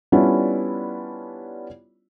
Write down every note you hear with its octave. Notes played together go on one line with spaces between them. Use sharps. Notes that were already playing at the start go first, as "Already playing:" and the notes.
G3 B3 C#4 D4 E4 F4